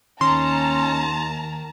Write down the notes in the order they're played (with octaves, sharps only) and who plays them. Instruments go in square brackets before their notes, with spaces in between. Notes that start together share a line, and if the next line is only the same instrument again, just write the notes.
[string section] D#2 A5 A#5 [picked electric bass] D#3 [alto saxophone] C#4 [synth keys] C6